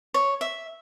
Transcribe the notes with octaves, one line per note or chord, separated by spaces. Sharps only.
C#5
E5